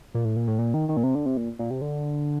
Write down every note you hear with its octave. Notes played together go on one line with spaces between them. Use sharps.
A#2
A2
A#2
A2
A#2
D#3
D#3
A#2
C3
D3
C3
A#2
A#2
C3
D3